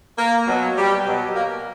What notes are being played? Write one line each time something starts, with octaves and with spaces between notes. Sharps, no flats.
A#3 A#4
B2 F#3
G3 G4
B2 F#3
A#3 A#4